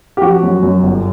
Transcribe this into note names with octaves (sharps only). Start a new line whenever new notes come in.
G4
F3 F#4
F#2
F#2
G1